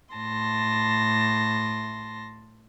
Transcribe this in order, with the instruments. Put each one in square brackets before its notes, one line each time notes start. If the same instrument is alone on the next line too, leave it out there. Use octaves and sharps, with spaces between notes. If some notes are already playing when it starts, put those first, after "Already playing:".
[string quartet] A2 A5 C6 A#6